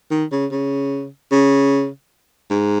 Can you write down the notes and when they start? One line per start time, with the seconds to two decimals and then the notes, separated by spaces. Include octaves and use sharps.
0.11 D#3
0.32 C#3
0.52 C#3
1.32 C#3
2.51 G#2